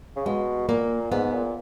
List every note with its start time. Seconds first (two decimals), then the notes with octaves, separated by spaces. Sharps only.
0.17 C#3
0.26 B2 G#3
0.69 A#2 A#3
1.12 G#2 B3
1.33 A#2